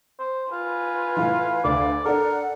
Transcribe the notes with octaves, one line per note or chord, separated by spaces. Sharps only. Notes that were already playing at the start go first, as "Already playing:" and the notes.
C5
F4 B4 G#5
A2 E3 F5
D2 D5
D4 A4 A#4 F#5